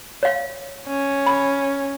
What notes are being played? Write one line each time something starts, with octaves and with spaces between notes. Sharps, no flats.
C#5 F5
C#4
B5